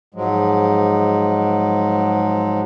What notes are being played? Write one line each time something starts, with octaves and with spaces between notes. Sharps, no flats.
G#2 F3 F#3 G#3